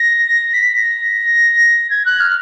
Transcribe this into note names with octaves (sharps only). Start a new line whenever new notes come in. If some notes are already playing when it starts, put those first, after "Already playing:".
Already playing: A#6
B6
A#6
G#6
F#6
F6